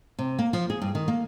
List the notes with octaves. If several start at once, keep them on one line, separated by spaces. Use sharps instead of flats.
C3
A#3
F3
G#4
G2
D#3
A#3